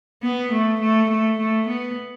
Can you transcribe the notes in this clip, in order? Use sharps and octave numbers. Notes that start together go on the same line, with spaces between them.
B3
A3
A3
A3
A3
B3